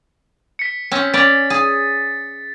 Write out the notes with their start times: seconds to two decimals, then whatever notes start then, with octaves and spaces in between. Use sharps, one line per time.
0.59 B6 C#7
0.91 C4 C#4
1.14 C#4 D5 A6
1.50 G#4